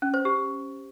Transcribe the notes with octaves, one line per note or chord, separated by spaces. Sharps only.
C#4
C5
G4